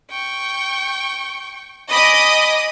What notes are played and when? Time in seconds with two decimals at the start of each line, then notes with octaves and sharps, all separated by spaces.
0.10 G5 C#6
1.91 D#5 G#5 B5 D6 D#6